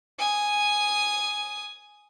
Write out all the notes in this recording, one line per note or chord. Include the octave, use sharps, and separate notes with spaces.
G#5 D#6